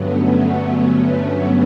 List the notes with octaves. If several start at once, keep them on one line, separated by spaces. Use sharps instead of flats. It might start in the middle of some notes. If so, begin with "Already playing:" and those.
Already playing: G2 D3 F#3 A3 B3 C#4
B3
A3 C#4